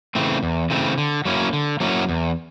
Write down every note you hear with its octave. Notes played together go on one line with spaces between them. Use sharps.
C#3 E3 A3 C4
E2
C#3 E3 A3 C4
D3
F#3 A#3 C#4 E4
D3
F#3 A#3 C#4 E4
E2